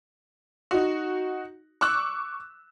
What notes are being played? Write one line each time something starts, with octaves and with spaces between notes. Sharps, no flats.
D#4 F#4
C#6 D6 E6 F#6